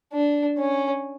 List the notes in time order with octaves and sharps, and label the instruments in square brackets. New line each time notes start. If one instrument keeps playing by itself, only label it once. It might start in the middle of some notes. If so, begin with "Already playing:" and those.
[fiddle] D4
C#4